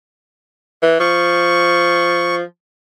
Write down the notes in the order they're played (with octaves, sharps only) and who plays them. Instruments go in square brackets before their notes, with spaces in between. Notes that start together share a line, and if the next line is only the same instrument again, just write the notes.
[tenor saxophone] E3
[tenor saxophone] F3 [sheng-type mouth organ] C#6